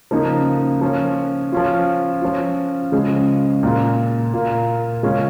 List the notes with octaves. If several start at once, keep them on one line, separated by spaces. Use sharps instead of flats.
C#3 F3 A#3 D#4
F3 C#4 F4
F3 C#4 F4
F3 C#4 F4
C#3 F3 G#3
A#2 A#3 F4
A#2 A#3 F4
C#3 G#3 C#4 F4